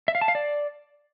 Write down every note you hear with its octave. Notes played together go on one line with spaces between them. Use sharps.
E5
F5
A5
F5
D5